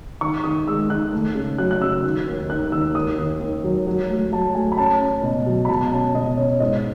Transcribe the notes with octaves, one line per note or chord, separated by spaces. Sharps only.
D#3 C#6
D#3 D#6
G#3 E6
D#3 F#6
A3
C#3
F#3 F#6
F#6
C#3 E6
D#3
D#2
D#3 F#6
D#2 E6
D#2 D#6
D#2
D#2
F#3
F#3
A3
F#3 A5
A3 G#5
B5
C#4 A5
C#4
B2
F#3
B5
B2 A5
C#4 A5
B2 D#5
C#4 C#5
G#2 D#5